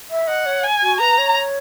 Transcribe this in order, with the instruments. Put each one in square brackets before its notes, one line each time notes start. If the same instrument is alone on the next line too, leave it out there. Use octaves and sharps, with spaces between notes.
[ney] E5
[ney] D#5 [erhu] F#5
[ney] C#5
[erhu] G#5
[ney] F#4
[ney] B4 [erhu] A#5
[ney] C#5